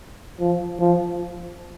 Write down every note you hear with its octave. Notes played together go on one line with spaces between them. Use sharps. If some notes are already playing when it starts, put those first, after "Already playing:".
F3
F3